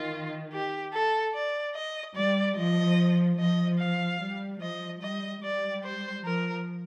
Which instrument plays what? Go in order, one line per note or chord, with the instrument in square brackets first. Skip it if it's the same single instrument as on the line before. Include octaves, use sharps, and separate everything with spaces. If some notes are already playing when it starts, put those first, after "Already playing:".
Already playing: [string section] D#3 [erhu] F4
[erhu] G4
A4
D5
D#5
[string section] G3 [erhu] D5
[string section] F3 [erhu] D#5
[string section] F3 [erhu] D#5
[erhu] F5
[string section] G3
[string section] F3 [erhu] D#5
[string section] G3 [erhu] D#5
[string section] G3 [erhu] D5
[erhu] C5
[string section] F3 [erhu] A#4